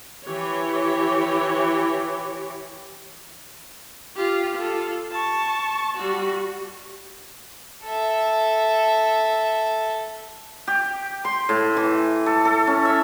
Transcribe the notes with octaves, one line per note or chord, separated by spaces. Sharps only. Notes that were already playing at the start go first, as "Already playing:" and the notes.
E3 G4 C#5
F4 G4
F4 A4
A5 C#6
G3 F#4
A4 E5
G4
C6
A2
E3
A4
A4
C#4
E5